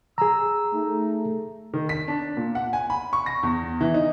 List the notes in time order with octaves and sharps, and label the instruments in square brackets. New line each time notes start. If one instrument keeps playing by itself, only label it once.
[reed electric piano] G#4 A#5 [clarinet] E6
[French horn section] A3 [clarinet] D#4
[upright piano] D#3
B6
D4
A#2
F#5
G#5
B5
C#6
A#6
E2
E3
D#4